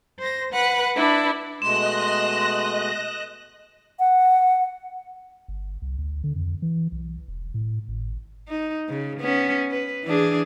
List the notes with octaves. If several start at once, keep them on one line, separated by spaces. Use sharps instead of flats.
C5 A#6
B4 F#5 F#6
D4 E4 B4
B2 G#3 A3 D#5 C6 F#6 A#6 E7
F#5
G1
C2
D2
D3
F2
E3
B1
E1
A2
G#1
D#4
C#3
B3 C#4
B4
E3 D4 G#4